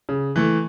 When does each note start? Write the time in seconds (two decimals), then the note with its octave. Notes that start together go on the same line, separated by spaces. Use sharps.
0.09 C#3
0.36 E3 A3